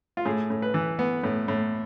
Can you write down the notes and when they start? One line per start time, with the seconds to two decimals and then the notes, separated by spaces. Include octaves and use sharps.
0.17 F4
0.25 A2 G#4
0.50 A2
0.62 B4
0.74 E3
0.99 B3
1.24 A2
1.48 A2